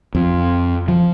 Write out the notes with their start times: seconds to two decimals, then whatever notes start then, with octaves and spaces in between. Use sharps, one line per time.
0.15 F2
0.88 F3